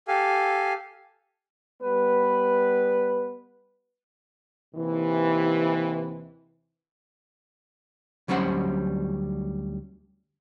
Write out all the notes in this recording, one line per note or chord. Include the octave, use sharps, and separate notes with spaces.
G4 A4 F5 G#5
G3 B3 B4
D#2 C3 E3
D2 F#3 G3 C#4 C5 F#5